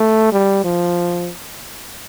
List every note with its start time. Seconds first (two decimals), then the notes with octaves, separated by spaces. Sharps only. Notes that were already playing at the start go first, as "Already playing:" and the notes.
Already playing: A3
0.32 G3
0.64 F3